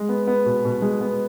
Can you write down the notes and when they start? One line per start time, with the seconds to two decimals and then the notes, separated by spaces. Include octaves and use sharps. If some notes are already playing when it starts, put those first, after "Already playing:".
Already playing: G#3
0.09 B3
0.27 B3
0.46 B2
0.65 B2
0.82 G#3
1.01 B3